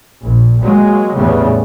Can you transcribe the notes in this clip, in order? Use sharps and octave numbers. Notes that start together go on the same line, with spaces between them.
A#1
F#3 G#3 A#3
E2 A2 C#3 G3 B3